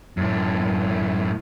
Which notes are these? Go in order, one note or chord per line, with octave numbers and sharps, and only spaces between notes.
F#2 A2